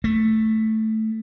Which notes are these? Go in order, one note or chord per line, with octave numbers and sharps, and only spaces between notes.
A3